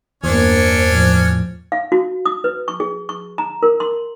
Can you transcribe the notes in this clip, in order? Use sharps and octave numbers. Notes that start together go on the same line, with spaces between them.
E2 G2 A#3 C#4 D4 C5 C#5
A2 F3
F5
F#4
D#6
B4
C#6
G#4
C#6
A#5
A#4
C6